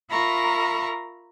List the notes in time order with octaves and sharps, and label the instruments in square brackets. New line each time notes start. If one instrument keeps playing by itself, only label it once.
[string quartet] F4 A#4 E5 A#5 B5 C#6